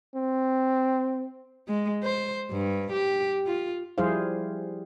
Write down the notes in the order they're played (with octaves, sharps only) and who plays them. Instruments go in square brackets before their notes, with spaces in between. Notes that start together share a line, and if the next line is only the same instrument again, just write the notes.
[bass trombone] C4
[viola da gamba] G#3
C5
G2
G4
F4
[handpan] F3 G3 E4 G#4 C5 F5